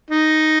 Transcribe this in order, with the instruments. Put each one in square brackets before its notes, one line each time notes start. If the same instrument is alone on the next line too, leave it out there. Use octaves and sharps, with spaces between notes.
[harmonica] D#4